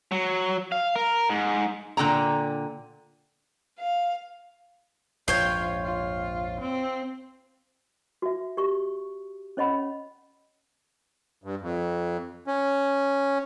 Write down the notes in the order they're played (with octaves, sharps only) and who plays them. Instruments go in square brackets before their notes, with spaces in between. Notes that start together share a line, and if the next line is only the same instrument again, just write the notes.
[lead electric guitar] F#3
F5
A#4
G#2
[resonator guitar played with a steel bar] A#2 D3 G5 A#5
[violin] F5
[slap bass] A#1 F2 G#2 [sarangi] F4 [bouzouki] C5 C#5 G5
[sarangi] F4
C4
[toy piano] F#4 E5
G4 C#6
C#4 C#5 D#5 F#5 B5
[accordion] G2
F2
C#4